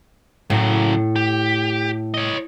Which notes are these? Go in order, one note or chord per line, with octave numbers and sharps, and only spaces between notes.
A2 C#3 F#3
G4
C#5 D#5